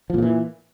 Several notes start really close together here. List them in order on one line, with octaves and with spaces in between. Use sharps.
F3 A#2 C#3 E3